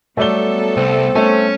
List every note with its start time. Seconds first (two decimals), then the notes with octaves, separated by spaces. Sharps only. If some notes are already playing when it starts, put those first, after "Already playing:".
0.17 F#3 G3 A3 B3 A4 D5 G7
0.77 C2 C4
1.15 A3 C#4